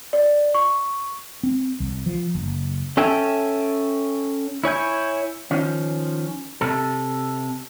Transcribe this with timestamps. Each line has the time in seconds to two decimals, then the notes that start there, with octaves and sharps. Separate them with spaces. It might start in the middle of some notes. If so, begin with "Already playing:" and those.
0.13 D5
0.54 C#6
1.43 C4
1.80 C2
2.06 F3
2.35 F#1
2.97 C#4 A4 E5 G5 G#5
4.64 E4 C#5 G#5 G6
5.51 D#3 F3 C#4
6.61 C3 A4